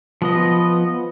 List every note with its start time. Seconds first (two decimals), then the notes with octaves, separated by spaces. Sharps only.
0.22 F3 B3 D#5